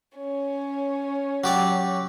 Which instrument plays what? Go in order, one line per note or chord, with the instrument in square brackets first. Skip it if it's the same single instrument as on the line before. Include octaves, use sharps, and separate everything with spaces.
[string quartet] C#4 C#5
[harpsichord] F#3 G4 D5